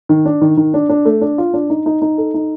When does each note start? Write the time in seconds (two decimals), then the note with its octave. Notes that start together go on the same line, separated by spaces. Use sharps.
0.09 D#3
0.25 D4
0.41 D#3
0.57 D#3
0.74 D4
0.89 D4
1.05 A3
1.21 D4
1.38 F4
1.54 D4
1.70 D#4
1.86 D#4
2.02 D#4
2.18 A4
2.34 D#4